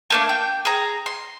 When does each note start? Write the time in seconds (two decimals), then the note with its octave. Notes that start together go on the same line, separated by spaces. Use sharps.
0.10 A3 A#3 D4
0.29 G5
0.65 G#4 A#5
1.06 C6